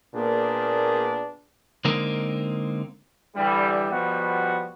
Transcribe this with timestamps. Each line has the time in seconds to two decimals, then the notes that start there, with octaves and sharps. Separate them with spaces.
0.15 A#2 A#3 B3 D4 G#4
1.85 D3 G#3 A#3 C4 D#4 A#4
3.36 D3 E3 G3
3.91 B2 F3 G3 B3 F#4